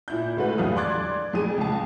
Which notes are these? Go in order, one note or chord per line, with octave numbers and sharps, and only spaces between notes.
A#2 E4 G6
D2 G#3 A3 F#4 B4
E2 G2 G4 F5 B5 D#6
D5 C6 D6 F#6 G#6 A6
F2 G#4 D#7
C#2 A5